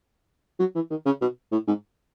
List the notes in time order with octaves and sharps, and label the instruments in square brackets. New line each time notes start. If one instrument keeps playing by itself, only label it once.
[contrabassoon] F#3
E3
D#3
C#3
B2
A2
G#2